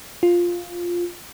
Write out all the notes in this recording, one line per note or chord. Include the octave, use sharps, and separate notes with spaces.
F4